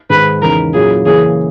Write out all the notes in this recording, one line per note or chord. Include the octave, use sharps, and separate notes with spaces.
G#2 D#3 G#3 B4
E2 C#3 G#3 D#4 A#4
A#2 F#3 C#4 E4 G#4
C#3 E3 A#3 C#4 G#4